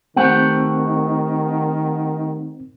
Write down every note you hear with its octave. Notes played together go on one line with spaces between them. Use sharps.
D#3 A3 C4 G4 F#5